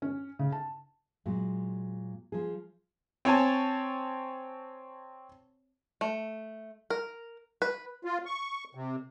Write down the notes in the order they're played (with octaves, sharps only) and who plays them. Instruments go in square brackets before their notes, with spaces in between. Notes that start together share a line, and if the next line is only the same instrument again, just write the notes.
[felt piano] C#4
C#3
A5
[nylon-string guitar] A#2 F#3 G#3
F3 G#4
[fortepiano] C4 C#5 G#5 A5
[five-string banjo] A3
A#4
B4
[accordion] F4
C#6
C3